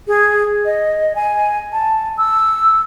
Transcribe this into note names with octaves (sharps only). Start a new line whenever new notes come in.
G#4
D#5
G#5
A5
E6